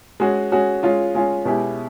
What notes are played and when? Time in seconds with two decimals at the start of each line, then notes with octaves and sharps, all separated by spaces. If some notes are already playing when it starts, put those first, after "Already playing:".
0.20 G#3 C#4 F#4
0.52 G#3 C#4 F#4
0.83 G#3 C#4 F4
1.15 G#3 C#4 F4
1.45 B2 G#3 C#4 E4 G4